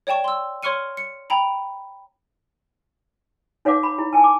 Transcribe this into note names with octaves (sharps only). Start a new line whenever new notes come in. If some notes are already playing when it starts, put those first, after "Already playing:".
C#5 D5 G5 A5 C#6
C6 E6
C#5 C6 C#6 F6 C#7 D#7
C#7
G5 A#5 B5
D#4 C#5 F5 F#5 D6
B5
E4
G#5 A5
D6